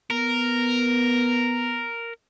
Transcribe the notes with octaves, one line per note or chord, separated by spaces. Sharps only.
B3 A#4